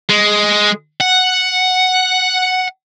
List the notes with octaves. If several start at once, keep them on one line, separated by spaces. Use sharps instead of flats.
G#3
F#5